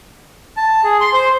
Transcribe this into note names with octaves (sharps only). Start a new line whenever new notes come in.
A5
G#4
C6
C5